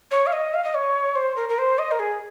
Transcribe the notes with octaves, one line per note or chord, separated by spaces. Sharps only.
C#5
F5
D#5
F5
D#5
C#5
C5
A#4
A#4
C5
D#5
A#4
G#4